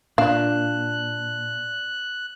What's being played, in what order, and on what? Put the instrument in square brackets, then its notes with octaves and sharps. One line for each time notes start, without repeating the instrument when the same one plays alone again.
[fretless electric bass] A#2 [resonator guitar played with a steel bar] D4 [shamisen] F5 [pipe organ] F#6